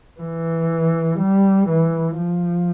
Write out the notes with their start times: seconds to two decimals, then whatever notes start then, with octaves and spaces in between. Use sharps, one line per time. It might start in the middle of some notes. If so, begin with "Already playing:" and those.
0.20 E3
1.19 G3
1.69 E3
2.17 F3